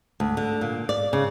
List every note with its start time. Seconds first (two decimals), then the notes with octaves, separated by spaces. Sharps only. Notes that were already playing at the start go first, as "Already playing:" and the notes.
0.20 D2
0.37 D3
0.61 A#2
0.89 D5
1.13 C#3